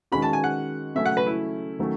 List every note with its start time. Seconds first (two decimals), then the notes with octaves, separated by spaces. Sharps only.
0.12 D#3 G#3 C#4 F#4 B5
0.22 A5
0.33 G#5
0.44 F#5
0.95 C#3 F#3 A3 C#4 E5
1.06 F#5
1.17 B4
1.26 E4
1.79 D#3 F#3 A3 C#4